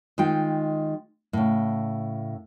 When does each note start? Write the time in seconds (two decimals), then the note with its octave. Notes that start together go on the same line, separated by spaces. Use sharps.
0.18 D#3 G#3 F4 G5
1.33 A2 C#3